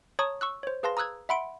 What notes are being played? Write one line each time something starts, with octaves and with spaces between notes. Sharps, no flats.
C#5 A5 A#5 C#6 D#6
C#6 E6 F#6
C5 C#5
G#4 B4 F5 A5 C6 A#6
A#5 D#6 E6 F#6 G#6
E5 F#5 B5 C6 D7